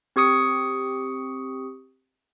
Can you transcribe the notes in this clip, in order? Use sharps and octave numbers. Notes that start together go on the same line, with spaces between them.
C4 G4 C#6 D#6 C#7